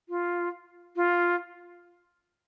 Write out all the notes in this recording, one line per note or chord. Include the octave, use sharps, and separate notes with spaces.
F4
F4